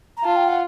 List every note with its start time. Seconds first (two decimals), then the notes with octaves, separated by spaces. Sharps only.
0.16 A#5
0.24 F4 A5
0.36 G5
0.48 F#5